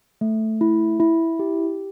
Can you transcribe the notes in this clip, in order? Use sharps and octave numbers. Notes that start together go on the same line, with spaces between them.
A3
E4
E4
G4